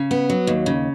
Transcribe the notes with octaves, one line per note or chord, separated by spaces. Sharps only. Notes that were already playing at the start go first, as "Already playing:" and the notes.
Already playing: C#3
B3
F#3
D#2
C#3